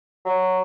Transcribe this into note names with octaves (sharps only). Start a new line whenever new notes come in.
F#3